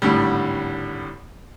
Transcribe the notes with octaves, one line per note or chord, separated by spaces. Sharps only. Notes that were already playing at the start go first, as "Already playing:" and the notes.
G#1 A2 D3 G3